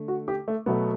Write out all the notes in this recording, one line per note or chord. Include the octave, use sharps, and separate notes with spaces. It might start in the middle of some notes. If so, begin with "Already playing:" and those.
Already playing: D3 A3
F#4
G4
A3
B2 F#3 A3 B3